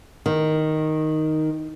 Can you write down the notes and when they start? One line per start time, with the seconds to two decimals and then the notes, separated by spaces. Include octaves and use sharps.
0.26 D#3